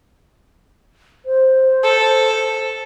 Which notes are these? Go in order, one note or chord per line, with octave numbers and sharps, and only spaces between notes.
C5
A4